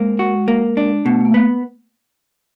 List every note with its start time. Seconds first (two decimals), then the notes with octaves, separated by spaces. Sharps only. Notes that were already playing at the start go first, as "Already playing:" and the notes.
Already playing: G#3 A#3 C4
0.19 F#4
0.48 A#3
0.77 D4
1.05 B2 A3
1.20 A3
1.25 A#3
1.34 B3